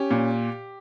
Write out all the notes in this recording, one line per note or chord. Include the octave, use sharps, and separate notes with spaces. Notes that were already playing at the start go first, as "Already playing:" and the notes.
Already playing: C#4 G4
A#2